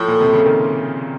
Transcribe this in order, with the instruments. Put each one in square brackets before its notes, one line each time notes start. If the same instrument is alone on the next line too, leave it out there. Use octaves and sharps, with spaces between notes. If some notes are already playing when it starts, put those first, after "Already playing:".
Already playing: [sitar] A2 [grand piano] F3
[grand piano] A#2
C3
C#3
D#3